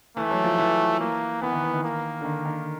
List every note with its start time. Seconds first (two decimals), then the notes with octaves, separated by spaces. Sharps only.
0.17 E3 A3
0.31 F#3
0.44 F3
0.58 E3
1.00 A#3
1.41 E3 B3
1.53 D#3
1.63 E3
1.74 D#3
1.84 A#3
2.21 D3
2.25 D#3
2.46 D#3